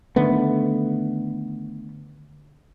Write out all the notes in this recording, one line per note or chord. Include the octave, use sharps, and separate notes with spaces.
D3 D#3 A3 B3